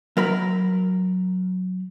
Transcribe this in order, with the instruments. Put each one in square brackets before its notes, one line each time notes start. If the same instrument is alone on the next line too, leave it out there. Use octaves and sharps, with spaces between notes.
[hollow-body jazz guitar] F#3 A#4 B5